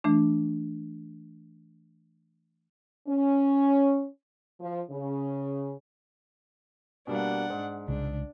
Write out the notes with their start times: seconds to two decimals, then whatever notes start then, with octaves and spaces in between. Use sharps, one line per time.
0.04 E3 A3 D4
3.08 C#4
4.60 F3
4.91 C#3
7.07 B2 G3 A#3 D4 F#5
7.50 G#2
7.88 C2 C#3 G#3 D4